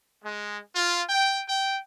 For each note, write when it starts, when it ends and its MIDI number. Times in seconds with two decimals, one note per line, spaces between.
0.24 0.58 56
0.75 1.03 65
1.09 1.43 79
1.47 1.79 79